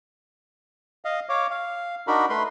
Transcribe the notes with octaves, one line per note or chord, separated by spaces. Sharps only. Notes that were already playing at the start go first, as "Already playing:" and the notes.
D#5 F5
C#5 F5 D6
F5
D4 D#4 F#4 A#4 B5
A3 B4 B5 C6